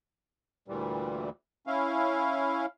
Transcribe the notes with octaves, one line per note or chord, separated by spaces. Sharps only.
D2 A#2 E3 G3
C#4 E4 F5